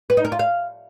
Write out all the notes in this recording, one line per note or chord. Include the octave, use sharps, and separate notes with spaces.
B4
D#4
A#4
F4
F5